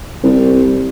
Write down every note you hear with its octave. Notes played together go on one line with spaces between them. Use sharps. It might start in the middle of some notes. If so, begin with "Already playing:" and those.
C2